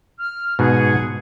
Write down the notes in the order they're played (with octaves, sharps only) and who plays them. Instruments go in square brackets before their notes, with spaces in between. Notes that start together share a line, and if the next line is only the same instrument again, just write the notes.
[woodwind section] F6
[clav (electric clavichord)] G#2 B2 [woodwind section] G#4 F#5